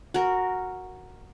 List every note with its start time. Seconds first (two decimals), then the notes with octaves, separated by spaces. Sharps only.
0.14 F#4 A#4